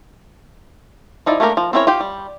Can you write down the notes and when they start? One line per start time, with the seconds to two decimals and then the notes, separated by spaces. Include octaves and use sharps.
1.26 F3 D#4 E4 D5
1.40 A3 A#3 D4 G4 A#4
1.57 F3
1.73 C4 C#4 E4 A#4 C#5
1.87 F4 G4 G5
2.00 G3